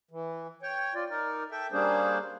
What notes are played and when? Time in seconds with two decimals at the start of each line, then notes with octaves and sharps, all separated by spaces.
0.11 E3
0.63 C#5 G5
0.95 F4 D5
1.10 D#4 A#4 D5
1.51 A4 E5 G5
1.72 G3 A#3 C#4 D4 G#4 C5